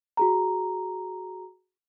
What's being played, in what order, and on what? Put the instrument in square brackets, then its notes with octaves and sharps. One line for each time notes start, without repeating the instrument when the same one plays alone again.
[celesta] F#4 G#4 A#5